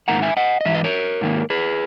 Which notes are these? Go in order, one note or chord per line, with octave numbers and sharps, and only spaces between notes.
G#2 D#3 A#3 F#5 A#5
E5 G#5
D#5 F#5
D#5
G#2 E3 E5
B4 D#5
A#4 C#5
G#2 D#3 A#3
G#4 B4